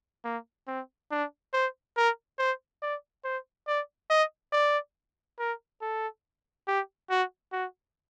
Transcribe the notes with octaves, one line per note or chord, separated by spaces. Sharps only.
A#3
C4
D4
C5
A#4
C5
D5
C5
D5
D#5
D5
A#4
A4
G4
F#4
F#4